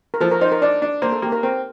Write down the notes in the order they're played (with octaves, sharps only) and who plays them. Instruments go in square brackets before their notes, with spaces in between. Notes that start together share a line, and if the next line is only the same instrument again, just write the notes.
[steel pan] A#4
[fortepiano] F3 [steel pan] A4
[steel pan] A#4
[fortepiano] D#4 [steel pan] C5
[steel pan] A#4
[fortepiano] D4 [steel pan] D5
[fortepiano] D4
[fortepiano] A#3 [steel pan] C5
[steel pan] A4
[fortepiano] A#3 [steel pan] G4
[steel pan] A#4
[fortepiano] C4 [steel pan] A#4